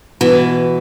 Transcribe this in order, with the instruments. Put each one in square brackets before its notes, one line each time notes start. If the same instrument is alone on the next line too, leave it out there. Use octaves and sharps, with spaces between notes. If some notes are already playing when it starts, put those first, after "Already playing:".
[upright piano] B2 [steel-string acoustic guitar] E3